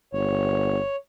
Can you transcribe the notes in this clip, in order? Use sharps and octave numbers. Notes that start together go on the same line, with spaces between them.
G1 C#5